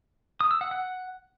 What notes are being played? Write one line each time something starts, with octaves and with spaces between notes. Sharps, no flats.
D#6
E6
F#5
F#5